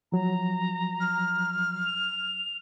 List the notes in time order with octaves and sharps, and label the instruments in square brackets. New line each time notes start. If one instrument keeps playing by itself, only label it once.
[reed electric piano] F3 F#3 [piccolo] A#5
[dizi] F6
[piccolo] F7